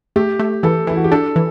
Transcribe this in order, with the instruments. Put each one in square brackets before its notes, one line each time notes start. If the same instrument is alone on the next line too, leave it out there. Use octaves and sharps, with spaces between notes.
[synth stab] A3 [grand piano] G4
[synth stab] A3
[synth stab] E3 [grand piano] A4
[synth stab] E3 [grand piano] E4
[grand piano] F#4
G4
[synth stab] D4 [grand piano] A4
[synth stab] E3